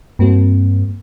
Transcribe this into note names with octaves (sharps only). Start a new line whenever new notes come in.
G2 A#3 C4 F#4